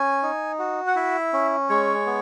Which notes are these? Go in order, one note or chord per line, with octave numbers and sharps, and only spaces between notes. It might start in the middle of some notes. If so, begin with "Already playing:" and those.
Already playing: C#4 G#5
D#4
F#4
F#5
E4 E5
C#4
G#3 C#5
B3